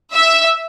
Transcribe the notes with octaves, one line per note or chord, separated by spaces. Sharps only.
E5